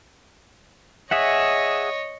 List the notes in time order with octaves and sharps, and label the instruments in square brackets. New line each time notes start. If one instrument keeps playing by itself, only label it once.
[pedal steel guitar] G#4 E5 F#5 [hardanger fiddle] C#5 D#5